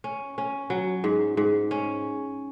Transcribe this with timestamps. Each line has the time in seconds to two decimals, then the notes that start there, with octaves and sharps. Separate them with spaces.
0.04 C#4
0.38 C#4
0.70 F#3
1.04 G#2
1.37 G#2
1.71 C#4